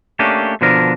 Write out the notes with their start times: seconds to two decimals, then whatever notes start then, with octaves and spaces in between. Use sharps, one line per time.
0.19 A3 A#3 C#4 D4 G4
0.61 B2 D3 F3 D4 A#4